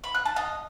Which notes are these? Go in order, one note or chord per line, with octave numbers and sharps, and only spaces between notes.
B5
F#6
A5
D#5